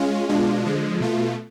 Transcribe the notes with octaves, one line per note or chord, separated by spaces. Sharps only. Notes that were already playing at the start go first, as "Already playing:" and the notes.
Already playing: G#3 C#4 F4
B2 G#3 D4 F4
D3 F3 G#3
B2 A3 F4